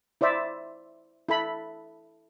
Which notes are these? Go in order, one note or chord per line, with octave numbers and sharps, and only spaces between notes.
E4 C5 D5 E5
E4 A4 B5